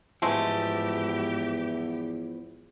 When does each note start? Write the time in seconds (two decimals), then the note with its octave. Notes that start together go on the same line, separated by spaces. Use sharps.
0.22 E2 G#2 F3 G#3 A3 B3 C4 G4